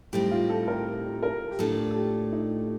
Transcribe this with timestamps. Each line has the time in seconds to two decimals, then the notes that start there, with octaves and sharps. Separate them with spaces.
0.13 A2 G3 C4 D#4 G4
0.31 F4
0.49 A4
0.67 A#4
1.23 A#4
1.51 G4
1.59 A2 A3 D4 F4 A4
1.91 A4
1.95 G4
2.32 D#4